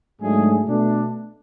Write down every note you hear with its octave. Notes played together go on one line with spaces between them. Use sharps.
G#2 F#3 G#3 A3 D4 G#4
B2 A3 D4